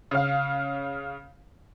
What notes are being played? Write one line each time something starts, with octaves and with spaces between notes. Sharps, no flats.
C#3 F5